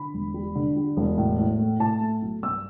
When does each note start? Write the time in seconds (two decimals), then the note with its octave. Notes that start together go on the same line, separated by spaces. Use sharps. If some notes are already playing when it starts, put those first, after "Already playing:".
Already playing: D3 B5
0.14 E1
0.34 G3
0.55 D3
0.76 G3
0.97 E1
1.18 A2
1.39 A2
1.59 A3
1.80 A2 A5
2.01 A3
2.22 B1
2.42 G2 E6